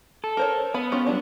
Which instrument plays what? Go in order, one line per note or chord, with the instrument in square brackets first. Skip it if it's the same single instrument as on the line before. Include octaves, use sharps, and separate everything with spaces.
[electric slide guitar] A4
[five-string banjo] A#4 C5 C#5
[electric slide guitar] B3 [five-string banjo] B5
[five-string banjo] C#4 F4 G5
F#3 G3 D4